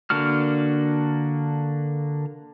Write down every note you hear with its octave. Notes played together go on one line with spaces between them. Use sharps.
D3 A#3 D4 F#4 F6